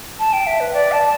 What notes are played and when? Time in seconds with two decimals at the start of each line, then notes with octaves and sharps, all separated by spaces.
0.19 A5
0.33 G5
0.46 E5
0.60 B4
0.74 D5
0.92 A5